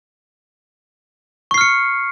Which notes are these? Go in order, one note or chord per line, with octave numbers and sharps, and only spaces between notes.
C#6 F6 C7 C#7